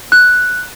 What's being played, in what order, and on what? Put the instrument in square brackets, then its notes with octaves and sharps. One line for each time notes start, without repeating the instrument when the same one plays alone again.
[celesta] F#6